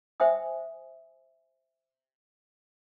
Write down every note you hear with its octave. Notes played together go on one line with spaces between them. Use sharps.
C5 E5 G5 G#5 D#6